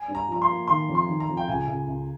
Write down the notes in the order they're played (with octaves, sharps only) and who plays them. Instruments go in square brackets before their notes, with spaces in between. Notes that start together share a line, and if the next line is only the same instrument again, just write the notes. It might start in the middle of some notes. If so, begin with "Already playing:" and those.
Already playing: [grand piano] G#5
[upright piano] G2
[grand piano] A#5
[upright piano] F3 [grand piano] A#5
[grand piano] C6
[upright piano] A#3
[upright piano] D#3 [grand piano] C6
[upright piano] F2
[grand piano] C6
[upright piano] D#3
[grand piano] A#5
[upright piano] F2
[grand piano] G5
[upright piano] C#2 [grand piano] G#5
[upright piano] C#2
C#2